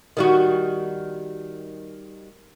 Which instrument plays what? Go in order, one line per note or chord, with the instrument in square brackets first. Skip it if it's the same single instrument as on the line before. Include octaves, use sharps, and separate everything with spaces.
[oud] D#3 G3 F#4